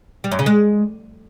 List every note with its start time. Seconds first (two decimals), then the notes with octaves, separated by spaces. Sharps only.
0.24 G3
0.31 F#2
0.39 C#3
0.46 G#3